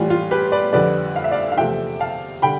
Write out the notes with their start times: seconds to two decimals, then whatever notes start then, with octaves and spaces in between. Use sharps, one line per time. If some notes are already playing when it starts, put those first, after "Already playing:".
Already playing: A2 E3 G3 F4
0.10 F4
0.31 G4 B4
0.52 B4 D5
0.73 F2 D3 G3 B4 D5
1.16 F5
1.24 E5
1.31 D5 F5
1.52 F5
1.57 E2 C3 F3 A3 E5 G5
2.00 F5 A5
2.42 D3 G3 G5 B5